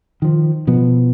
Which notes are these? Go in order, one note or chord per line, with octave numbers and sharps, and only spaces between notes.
D#3 F3
B2 F3 B3